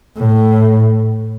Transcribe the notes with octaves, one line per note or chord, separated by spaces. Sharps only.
A2